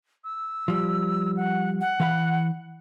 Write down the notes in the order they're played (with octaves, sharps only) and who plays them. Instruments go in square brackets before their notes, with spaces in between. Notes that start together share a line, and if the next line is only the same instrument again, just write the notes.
[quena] E6
[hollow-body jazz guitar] F3 G3
[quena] F#5
F#5
[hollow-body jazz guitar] E3 F5 B5